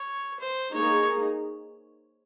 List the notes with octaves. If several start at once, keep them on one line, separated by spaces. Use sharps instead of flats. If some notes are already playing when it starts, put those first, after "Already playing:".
Already playing: C#5
C5
A#3 D#4 G#4 C#5